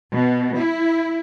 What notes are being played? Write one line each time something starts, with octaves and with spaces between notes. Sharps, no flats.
B2
E4